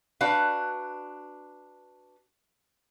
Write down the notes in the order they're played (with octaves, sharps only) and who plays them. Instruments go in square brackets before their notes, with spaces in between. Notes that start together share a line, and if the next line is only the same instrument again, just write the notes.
[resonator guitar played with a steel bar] D4 F#4 B4 F5